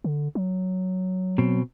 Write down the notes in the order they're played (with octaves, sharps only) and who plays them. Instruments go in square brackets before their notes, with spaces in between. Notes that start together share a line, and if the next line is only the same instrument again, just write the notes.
[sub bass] D3
F#3
[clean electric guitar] B2 C4